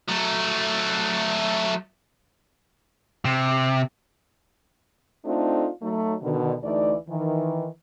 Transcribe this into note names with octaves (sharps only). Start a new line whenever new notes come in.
F#3 A3
C3
A3 C4 D4 D#4 F4 A4
F#3 A3 D#4
B2 D3 D#3
D2 E3 A3 D#4 D5
D#3 E3